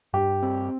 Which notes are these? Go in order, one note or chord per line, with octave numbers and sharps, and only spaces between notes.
G2 G4
C4